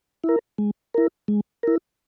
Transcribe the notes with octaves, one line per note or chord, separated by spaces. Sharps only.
E4
A#4
G#3
E4 A#4
G#3
E4 A#4